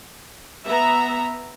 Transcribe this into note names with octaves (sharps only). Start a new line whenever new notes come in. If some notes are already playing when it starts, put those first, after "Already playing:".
B3 E5 A#5